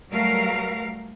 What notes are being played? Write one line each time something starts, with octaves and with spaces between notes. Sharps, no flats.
F#3 G3 A3 A#4 B4 F5